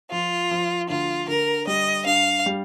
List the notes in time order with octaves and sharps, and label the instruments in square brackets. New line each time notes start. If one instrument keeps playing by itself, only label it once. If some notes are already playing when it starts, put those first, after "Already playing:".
[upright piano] F3 [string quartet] F4
[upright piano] F3
[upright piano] D2 [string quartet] F4
[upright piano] D3 [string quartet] A#4
[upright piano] G3 [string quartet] D#5
[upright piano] G2 [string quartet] F5
[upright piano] G3